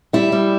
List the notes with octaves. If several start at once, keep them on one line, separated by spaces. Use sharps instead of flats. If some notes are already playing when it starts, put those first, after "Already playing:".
G3 E4
G3